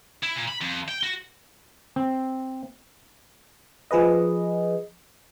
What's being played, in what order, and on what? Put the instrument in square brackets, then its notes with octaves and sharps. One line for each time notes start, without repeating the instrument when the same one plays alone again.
[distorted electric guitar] E4
A#2
B5
F2
G5
F#4
[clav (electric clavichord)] C4
[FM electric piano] F3 G#4 B4 D#5